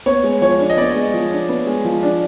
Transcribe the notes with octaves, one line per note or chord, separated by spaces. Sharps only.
B3 C#5
G#3
F3 C#5
D4
D#5
B3 D5
G#3
F3
D4
B3
G#3
F3
D4